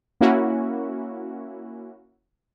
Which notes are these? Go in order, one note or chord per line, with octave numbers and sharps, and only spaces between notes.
A#3 C#4 E4 F#4